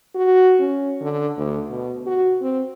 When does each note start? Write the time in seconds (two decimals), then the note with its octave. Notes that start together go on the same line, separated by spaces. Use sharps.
0.15 F#4
0.60 C#4
1.01 D3
1.37 D2
1.70 B2
2.06 F#4
2.42 C4